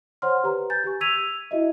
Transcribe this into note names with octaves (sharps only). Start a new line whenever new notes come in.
C5 C#5 F#5 C6 F6
G4 B4 A#5
G#5 G6 A6
G4 C#6
E6 G#6 B6 D#7 F7
E4 F#4 D#5 E5